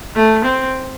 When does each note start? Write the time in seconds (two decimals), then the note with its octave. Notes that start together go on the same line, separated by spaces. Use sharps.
0.16 A3
0.45 C4